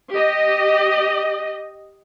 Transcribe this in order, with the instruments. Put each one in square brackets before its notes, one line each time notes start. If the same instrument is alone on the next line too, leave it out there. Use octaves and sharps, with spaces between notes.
[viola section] G4 D#5